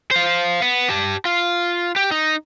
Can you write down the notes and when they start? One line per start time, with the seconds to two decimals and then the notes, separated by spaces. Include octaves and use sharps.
0.11 C5 F5
0.62 B3
0.90 G4 A5
1.25 F4
1.96 G4
2.12 D#4